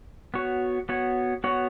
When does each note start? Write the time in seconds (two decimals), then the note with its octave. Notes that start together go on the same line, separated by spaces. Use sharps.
0.34 B3 F#4 C#5
0.89 B3 F#4 C#5
1.44 B3 F#4 C#5